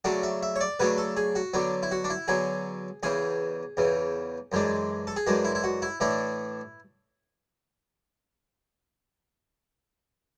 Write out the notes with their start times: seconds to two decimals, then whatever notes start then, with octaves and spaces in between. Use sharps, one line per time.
0.04 C#3 F#3 A3 D4 F#4
0.23 E5
0.43 E5
0.56 C#5
0.61 D5
0.80 C#3 F#3 A3 D4 B4
0.98 A4
1.17 G#4
1.35 F#4
1.54 D3 F#3 B3 D4
1.83 E4
1.91 F#4
2.04 D4
2.10 E4
2.28 D3 F#3 B3 G#4
3.03 E2 C#3 E3 G#4
3.77 E2 C#3 E3
4.52 F#2 E3 G#3 D4
5.07 A4
5.16 G#4
5.27 F#2 E3 G#3 D4 F#4
5.45 E4
5.55 E4
5.64 F#4
5.82 E4
6.00 A2 E3 A3 D4 E4